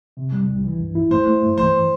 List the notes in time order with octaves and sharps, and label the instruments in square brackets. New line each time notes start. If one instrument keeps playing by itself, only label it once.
[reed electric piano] C3
G3
C2
E3
G2
E4
[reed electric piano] A3 [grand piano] C5
[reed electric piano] A3
G2
[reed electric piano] E3 [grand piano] C5